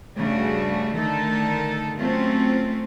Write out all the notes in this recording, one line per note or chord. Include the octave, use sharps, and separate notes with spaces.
G2 C#3 A3 D4 F#4
D3 D#3 A3 D#4 A4 A#4
F#3 A3 C4 C#4 F4